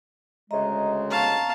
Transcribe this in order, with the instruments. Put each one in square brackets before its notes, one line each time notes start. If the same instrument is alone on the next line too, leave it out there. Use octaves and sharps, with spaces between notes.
[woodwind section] D2 C#3 G#3 [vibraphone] D#5 E5 A#5
[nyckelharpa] F5 A5 [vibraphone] A#5 C#6